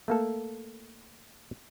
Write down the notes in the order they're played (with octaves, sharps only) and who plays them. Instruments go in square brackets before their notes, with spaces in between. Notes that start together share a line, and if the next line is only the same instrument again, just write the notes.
[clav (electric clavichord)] A3 A#3 A4